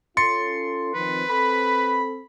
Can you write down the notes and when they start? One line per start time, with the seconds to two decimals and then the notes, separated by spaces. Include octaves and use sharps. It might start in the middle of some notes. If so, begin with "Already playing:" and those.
0.17 C#4 F4 A4 C6 A6 C#7
0.94 D#3 F3 C4 B4
1.28 C4 A4 B5